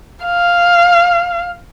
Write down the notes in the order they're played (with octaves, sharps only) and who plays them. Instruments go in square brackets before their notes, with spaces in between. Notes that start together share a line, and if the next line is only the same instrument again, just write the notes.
[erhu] F5